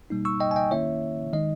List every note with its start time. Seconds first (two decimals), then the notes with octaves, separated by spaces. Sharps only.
0.10 B2 G3 A#3 D#4
0.25 C#6 E6
0.40 D#5 G5
0.51 G#5
0.56 D#5 G5
0.71 D#3 A#3 C#4 E4 C#5 E5
1.33 D#3 G#3 D#4 D#5